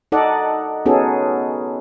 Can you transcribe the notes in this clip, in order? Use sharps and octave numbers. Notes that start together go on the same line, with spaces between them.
D#4 A4 D5 D#5 F#5
B3 C#4 D#4 F#4 G#4 A4